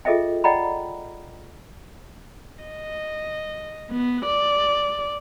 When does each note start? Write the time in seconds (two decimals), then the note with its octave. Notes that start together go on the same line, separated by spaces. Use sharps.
0.05 F4 G#4 A4 D#5 E5 G5
0.44 D5 D#5 F#5 G5 A#5 B5
2.64 D#5
3.90 B3
4.26 D5